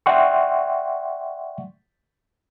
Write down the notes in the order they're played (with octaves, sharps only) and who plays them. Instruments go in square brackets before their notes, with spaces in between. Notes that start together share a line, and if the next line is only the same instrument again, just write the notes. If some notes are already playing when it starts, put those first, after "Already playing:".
[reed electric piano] D5 E5 F#5 G5 C6 C#6